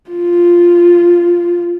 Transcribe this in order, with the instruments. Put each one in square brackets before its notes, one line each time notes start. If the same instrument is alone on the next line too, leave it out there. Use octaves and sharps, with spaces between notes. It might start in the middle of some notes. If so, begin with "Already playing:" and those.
[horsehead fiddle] F4